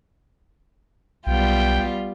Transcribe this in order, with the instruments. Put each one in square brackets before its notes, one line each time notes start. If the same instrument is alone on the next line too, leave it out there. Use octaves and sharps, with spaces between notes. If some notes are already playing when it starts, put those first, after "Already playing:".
[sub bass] B1 [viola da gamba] G3 B3 F4 [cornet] G5